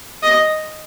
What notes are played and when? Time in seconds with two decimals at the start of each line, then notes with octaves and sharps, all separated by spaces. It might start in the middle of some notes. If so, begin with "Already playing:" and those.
0.23 D#5